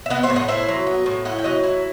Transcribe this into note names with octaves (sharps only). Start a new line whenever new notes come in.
E5
B3 D#5 F#5
C5 E5
A2
D#5 F#5
E4 C5 E5
F#3
B3
A2
E4 D#5 F#5
G5
F#3 D#5 F#5
E4